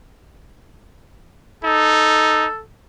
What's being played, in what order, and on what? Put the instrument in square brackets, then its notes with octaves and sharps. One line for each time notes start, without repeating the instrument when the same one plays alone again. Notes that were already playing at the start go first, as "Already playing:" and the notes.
[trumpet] D#4 [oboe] A4